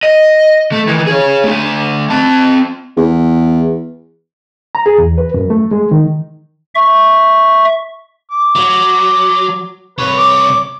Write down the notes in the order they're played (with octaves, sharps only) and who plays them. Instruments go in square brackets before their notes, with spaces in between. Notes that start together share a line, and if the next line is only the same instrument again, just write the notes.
[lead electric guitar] D#5
A3
D#3 E3
G#4 C#5
A3 D4
C4 A5
[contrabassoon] E2
[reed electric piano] A#5
G#4
E2
B4
F#2
A3
G#3
D#3
[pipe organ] E5 C#6
[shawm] D6
[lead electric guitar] F#3
[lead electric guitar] C2 C#5 [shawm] B4
[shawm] D6